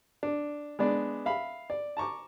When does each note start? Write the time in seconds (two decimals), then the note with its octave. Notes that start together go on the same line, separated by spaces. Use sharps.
0.23 D4
0.79 G#3 B3 D4 D5
1.26 E5 F5 B5
1.70 D5
1.97 A5 A#5 C#6 D6